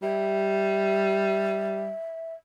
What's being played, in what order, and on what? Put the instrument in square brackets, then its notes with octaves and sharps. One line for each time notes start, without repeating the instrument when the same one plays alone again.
[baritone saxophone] G3 [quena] E5